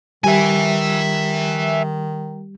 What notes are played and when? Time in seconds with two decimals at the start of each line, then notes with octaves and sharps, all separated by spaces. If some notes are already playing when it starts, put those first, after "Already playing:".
0.24 D#3 G3 G4 E5 G#5